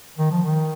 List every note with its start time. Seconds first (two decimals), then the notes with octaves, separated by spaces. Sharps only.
0.17 D#3
0.31 F3
0.44 D#3